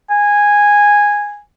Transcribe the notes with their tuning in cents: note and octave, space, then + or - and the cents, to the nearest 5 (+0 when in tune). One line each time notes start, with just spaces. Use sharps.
G#5 -10